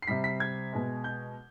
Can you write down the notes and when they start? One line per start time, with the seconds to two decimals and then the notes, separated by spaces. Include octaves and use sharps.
0.02 C7
0.07 C3 G3 B6
0.24 B6
0.40 G#6
0.73 B2 G#3
1.04 G6